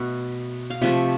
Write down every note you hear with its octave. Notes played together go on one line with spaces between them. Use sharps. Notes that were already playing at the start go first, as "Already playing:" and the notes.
Already playing: B2 A3
F5
C3 F3 A3 E5